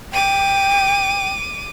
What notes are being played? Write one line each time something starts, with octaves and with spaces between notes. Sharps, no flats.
G5 D6 D#7